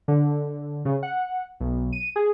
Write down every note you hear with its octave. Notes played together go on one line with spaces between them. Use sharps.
D3
C#3
F#5
B1
D#7
G#4